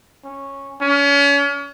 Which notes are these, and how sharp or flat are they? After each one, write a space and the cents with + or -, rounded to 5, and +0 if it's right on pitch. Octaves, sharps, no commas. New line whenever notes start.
C#4 -10
C#4 +35